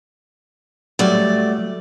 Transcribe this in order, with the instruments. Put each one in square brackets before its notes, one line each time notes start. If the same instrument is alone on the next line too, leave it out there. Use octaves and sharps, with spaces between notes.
[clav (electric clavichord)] F#3 G3 [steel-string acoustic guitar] A3 D5